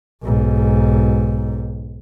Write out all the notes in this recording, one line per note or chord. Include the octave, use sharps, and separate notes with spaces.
B1 G#2